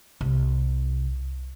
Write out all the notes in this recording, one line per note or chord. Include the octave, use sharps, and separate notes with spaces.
C2